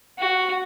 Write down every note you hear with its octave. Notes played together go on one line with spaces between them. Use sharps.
F#4